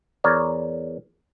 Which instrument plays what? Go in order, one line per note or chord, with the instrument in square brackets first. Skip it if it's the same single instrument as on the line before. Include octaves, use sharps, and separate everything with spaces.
[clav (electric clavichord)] E2 A#4 C#5 D5